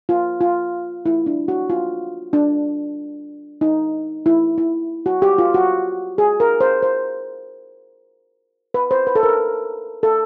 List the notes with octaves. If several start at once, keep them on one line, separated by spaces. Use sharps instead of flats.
F4
F4
E4
D4
F#4
F4
D4
D#4
E4
E4
F#4
G4
F4
F#4
G#4
A#4
C5
C5
B4
C5
B4
A4
A#4
A4